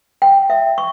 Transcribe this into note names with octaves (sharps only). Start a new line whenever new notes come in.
G5
E5
C#6